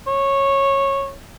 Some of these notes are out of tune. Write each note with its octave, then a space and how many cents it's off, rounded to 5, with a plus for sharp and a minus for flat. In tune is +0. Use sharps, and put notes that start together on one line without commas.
C#5 -15